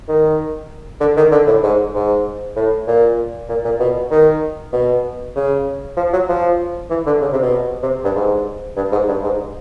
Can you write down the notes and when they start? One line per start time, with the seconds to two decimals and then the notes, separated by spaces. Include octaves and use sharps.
0.09 D#3
1.00 D3
1.17 D#3
1.31 D3
1.47 A2
1.63 G#2
1.95 G#2
2.56 A2
2.87 A#2
3.49 A#2
3.65 A#2
3.80 B2
4.11 D#3
4.73 B2
5.36 C#3
5.97 F3
6.13 F#3
6.29 F3
6.90 E3
7.06 D3
7.21 C#3
7.32 C3
7.42 B2
7.83 C3
8.04 G2
8.15 G#2
8.76 G2
8.92 G#2
9.08 G2
9.23 G#2